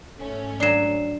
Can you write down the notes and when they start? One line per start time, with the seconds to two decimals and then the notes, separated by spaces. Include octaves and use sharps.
0.17 G#2 A3 C#4
0.60 F#3 D4 D5 C7 E7